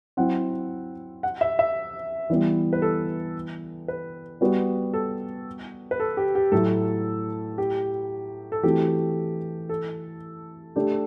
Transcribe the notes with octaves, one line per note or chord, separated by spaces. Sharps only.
F#3 C4 E4 F#5
F#5
E5
E5
E3 G3 B3 E4
B4
A4
B4
G3 B3 F#4 B4
A4
B4
A4
G4
G4
A2 F#3 A3 E4 A4
G4
A4
E3 A3 C4 F#4 G4
A4
A3 D4 G4